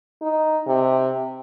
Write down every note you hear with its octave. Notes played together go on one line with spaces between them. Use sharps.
D#4
C3